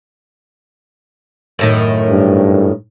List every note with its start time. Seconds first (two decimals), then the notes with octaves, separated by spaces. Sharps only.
1.59 F#2 A2 D#3
2.09 G2